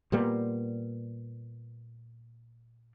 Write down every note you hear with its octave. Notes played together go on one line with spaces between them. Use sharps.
A#2 G3 A#3 B3